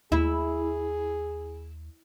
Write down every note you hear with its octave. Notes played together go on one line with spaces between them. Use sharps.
D#2 E4 G#4